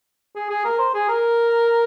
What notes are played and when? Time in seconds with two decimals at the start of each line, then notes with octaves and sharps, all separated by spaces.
0.36 G#4
0.50 G#4
0.65 A#4
0.79 C5
0.94 G#4
1.09 A#4